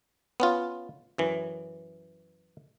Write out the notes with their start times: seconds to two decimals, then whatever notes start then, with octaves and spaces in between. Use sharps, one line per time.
0.40 B3 C#4 F4
1.18 F#2 E3